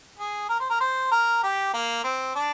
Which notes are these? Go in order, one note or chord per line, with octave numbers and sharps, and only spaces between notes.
G#4
A#4
C5
A#4
C5
A#4
G4
A#3
C4
D4